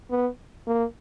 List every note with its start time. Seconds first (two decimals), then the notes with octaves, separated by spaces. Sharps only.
0.11 B3
0.67 A#3